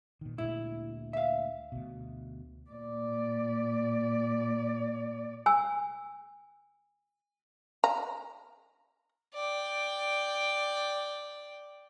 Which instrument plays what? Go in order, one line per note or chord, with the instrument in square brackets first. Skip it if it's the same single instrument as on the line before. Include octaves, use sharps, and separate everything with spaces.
[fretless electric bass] A#2 D#3
[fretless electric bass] D2 A#2 G#3 [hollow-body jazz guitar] E4
[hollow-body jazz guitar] E5 F5
[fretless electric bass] D2 B2
[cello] A#2 D5
[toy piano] G#5 E6
[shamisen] A#5
[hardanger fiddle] D5 G5